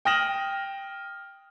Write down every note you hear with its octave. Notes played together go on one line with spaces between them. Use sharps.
G5 D#6 F6 A#6 E7 F#7